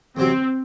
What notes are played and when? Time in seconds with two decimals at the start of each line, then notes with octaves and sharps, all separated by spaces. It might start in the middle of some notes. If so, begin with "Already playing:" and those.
0.17 E2 C3 F#3 C4